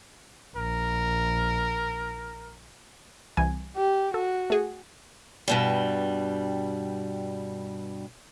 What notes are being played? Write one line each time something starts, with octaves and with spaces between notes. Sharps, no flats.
A#1 A#4
C2 E3 G#5
G4
F#4 A4
A3 G#4
G2 B2 G3